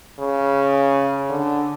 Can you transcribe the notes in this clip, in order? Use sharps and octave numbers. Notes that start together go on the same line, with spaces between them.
C#3
D3